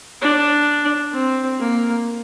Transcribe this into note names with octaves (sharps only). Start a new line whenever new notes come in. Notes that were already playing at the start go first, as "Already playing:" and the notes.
D4
C4
A#3